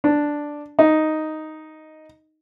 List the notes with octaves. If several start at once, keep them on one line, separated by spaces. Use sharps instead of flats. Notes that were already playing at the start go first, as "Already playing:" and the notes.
D4
D#4